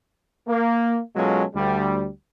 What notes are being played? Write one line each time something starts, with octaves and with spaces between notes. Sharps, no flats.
A#3
B2 F#3 G#3 C#4 F4 A4
D2 G3